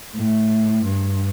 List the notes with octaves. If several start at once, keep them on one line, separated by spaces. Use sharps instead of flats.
A2
G2